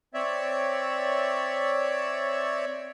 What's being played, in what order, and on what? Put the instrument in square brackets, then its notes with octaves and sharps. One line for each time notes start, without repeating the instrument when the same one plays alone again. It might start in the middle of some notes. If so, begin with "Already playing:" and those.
[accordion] C4 C#5 D5 E5